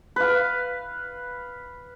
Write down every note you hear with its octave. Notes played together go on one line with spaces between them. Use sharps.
B4 F5